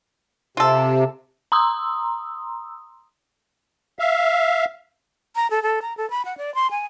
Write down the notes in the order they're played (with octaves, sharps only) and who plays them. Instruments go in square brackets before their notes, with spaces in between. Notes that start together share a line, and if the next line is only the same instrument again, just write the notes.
[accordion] C3 [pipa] F4 A4
[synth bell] A#5 C6 D#6 E6
[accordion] E5 F5
[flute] A#5
A4
A4
A#5
A4
B5
F#5
D5
C6
G#5